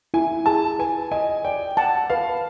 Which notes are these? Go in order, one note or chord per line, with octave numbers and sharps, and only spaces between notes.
E4 G#5
G#4 A5
B4 G#5
D#5 G#5
D5 G5
F#5 A5
B4 F5